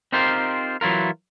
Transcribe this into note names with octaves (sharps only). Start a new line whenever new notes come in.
C4 D#4 F4 G4 A#4 C5
E3 F#3 E4 F4 A#4